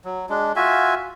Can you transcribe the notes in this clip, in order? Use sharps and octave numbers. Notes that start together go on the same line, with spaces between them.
F#3
G#3 D4
F4 F#4 E5 G#5